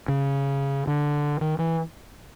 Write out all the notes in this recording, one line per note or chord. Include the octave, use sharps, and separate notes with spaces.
C#3
D3
D#3
E3